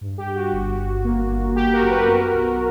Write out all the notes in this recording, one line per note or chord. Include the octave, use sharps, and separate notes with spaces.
G2
G4
G2
F#4
G1
G1
A#3
G1
A#3 G4
F#4 A#4
F#2
G4 B4
B3 F#4 A#4
B1